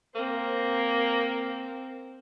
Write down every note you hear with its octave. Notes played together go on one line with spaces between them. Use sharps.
A#3 C4 A#4